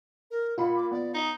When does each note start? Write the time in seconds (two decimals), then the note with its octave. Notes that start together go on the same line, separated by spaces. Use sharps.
0.31 A#4
0.58 A#2 F4 F#5 B5
0.75 D6
0.91 B3 D5
1.14 D#4 D#6